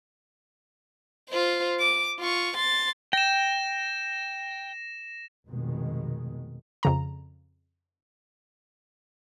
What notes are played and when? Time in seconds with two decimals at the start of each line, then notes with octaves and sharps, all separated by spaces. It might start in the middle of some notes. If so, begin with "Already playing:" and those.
1.30 F4 C5
1.80 D6
2.19 F4 C#6
2.57 C6 A6
3.13 G5 A#6 E7
5.48 F1 B2 D#3 G#3
6.83 F2 C#3 A#5